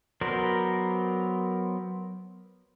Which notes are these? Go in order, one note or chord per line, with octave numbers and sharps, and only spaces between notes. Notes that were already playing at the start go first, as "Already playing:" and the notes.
F#3 B3 A#4 C5 D5